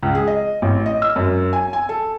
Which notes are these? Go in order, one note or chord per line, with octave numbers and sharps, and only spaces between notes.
C#2
G#4
D#5
A1
D#5
E6
F#2
G#5
G#5
A4